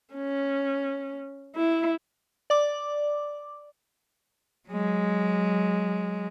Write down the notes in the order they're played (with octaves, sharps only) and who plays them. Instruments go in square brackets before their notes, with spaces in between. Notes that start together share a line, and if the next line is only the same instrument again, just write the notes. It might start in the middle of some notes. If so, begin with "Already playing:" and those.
[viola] C#4
E4
[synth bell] D5 D6
[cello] F#3 G#3